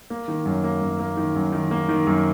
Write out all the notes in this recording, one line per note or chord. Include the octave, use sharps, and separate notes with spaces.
A#3
D#3
F#2
A#3
F#2
A#3
D#3
F#2
D#3
A#3
D#3
F#2